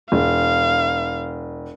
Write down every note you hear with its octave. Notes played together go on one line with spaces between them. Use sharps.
E1 F5